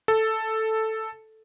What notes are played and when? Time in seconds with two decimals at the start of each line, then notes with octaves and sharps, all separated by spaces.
0.08 A4